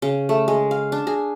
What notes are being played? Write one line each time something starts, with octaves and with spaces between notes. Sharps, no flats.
C#3
A3
G#3
F5
D4
G#4